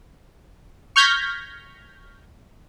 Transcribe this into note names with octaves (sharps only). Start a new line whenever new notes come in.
C#6 F6 G6 G#6 A#6 B6